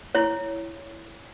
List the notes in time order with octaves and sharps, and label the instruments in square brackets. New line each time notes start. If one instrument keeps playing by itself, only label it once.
[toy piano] E4 C#5